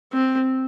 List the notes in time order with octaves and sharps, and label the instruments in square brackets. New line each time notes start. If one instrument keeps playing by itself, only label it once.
[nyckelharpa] C4